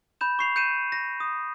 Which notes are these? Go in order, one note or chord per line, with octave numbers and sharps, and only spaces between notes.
B5 G6 E7
C#6 C7 F7
G6 C#7 D#7 E7
A#6
D#6